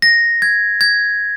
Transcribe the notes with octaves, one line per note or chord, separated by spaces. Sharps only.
A#6
G#6
G#6